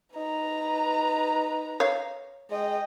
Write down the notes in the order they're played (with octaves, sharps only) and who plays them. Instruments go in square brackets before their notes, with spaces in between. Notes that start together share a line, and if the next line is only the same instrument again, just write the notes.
[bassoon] D#4 [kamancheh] B4 A#5
[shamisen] C#5 F5
[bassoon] G#3 [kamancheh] D#5 G5